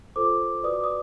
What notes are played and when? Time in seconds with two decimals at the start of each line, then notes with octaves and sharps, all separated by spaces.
0.16 F4 A4 C5 D6
0.63 F#4 B4 D5 D#6
0.73 D6
0.84 D#6